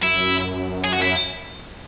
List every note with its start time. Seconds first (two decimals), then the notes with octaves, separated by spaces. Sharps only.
0.02 F#2 E4
0.84 G#4
0.93 F#4
1.02 E4